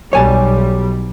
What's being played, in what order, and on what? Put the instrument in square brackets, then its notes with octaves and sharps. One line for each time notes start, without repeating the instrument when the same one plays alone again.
[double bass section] B1 G3 [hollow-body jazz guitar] C#5 G#5 A5